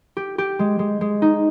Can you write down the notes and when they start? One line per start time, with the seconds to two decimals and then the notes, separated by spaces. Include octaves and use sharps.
0.17 G4
0.38 G4
0.59 G#3
0.79 G#3
1.01 G#3
1.22 D#4